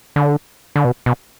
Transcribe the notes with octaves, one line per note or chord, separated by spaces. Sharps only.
D3
D3
B2
B2